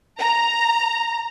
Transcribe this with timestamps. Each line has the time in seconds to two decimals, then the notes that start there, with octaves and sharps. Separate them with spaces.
0.18 A#5